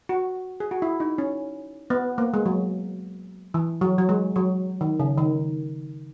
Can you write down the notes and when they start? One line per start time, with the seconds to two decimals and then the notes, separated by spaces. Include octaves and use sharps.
0.09 F#4
0.60 G#4
0.71 F#4
0.82 E4
1.00 D#4
1.18 C#4
1.90 B3
2.18 A#3
2.34 G#3
2.46 F#3
3.54 E3
3.81 F#3
3.98 F#3
4.09 G#3
4.36 F#3
4.81 D#3
5.00 C#3
5.18 D#3